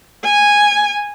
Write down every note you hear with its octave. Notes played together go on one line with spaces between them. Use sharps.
G#5